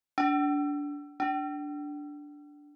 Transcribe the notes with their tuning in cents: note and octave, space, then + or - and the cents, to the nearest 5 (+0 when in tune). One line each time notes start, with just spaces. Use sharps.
D4 -20
D4 -5